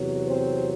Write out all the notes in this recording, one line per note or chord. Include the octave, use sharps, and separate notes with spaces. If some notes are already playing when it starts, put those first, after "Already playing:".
Already playing: E2 C3 F#3
C4 C5